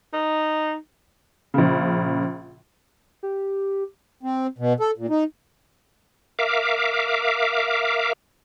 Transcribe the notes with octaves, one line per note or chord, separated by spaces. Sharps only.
D#4
A#1 C#3
G4
C4
B2
A4
A#2
D#4
A#4 E5 F5 D6